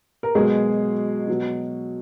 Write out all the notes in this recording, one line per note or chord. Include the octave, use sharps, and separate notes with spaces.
A#4
B2 F#3 G#3 G#4
B2 F#3